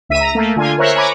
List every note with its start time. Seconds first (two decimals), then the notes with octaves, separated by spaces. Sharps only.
0.09 C#2 E5 B6 D#7
0.21 A#5
0.35 A3 A#3
0.56 D3 F4 G#5
0.78 A#4 C5 C#5 E5 C#6 F#6
0.95 C#5 G#5 A#5 B5 D6